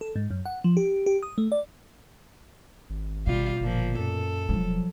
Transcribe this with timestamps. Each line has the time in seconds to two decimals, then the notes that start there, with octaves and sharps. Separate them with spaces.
0.01 A4
0.16 G#2
0.31 F#2
0.46 F#5
0.64 F3
0.77 G4
1.06 G4
1.23 D#6
1.38 A3
1.52 D5
2.90 G#1
3.27 B2 G3 F4
3.61 G1 A#2 F3
3.99 F#2 A4
4.49 E1 F3 F#3